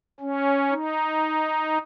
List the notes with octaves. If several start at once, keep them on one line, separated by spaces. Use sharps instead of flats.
C#4
D#4